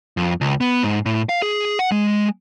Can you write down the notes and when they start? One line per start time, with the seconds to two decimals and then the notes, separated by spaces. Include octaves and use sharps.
0.17 F2
0.41 C#2
0.61 B3
0.83 G#2
1.06 A2
1.29 F5
1.42 G#4
1.79 F#5
1.92 G#3